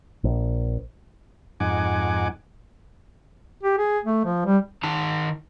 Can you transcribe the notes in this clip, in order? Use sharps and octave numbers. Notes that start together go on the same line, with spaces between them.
A#1
F2 G#2 D#4 F#5 G#5 D6
G4
G#4
A3
F3
G3
D#3 D#4 A5